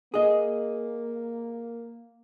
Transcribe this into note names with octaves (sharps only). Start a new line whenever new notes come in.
A#3 G#4 D#5